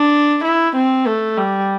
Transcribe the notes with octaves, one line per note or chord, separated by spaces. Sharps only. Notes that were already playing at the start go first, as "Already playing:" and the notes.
Already playing: D4
E4
C4
A3
G3